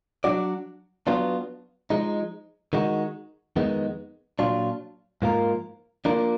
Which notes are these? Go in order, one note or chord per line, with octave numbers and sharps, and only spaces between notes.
F#3 D4 F#4 D5
F#3 B3 D4 F4
F3 G#3 D#4
D#3 G#3 D#4 F#4
F2 D#3 G#3 B3 D#4
A#2 F#3 D4 F4
G#2 F3 A#3 F4 A#4
F3 A#3 D4 F4 A#4